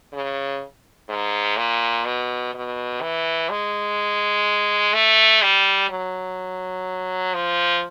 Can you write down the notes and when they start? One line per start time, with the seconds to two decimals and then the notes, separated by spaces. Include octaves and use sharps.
0.13 C#3
1.09 G#2
1.57 A#2
2.05 B2
2.54 B2
3.01 E3
3.50 G#3
4.93 A3
5.42 G3
5.89 F#3
7.34 F3